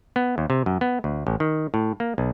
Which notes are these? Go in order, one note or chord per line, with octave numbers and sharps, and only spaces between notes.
B3
D#2
C3
F#2
B3
D2
A1
D#3
A2
A#3
B1